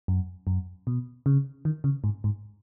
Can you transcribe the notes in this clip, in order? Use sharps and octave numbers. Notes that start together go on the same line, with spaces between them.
F#2
F#2
B2
C#3
D#3
C#3
G#2
G#2